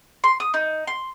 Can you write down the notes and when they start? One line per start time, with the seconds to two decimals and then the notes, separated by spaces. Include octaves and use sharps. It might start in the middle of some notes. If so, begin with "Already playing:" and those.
0.24 C6
0.40 D#6
0.54 D#4
0.87 C6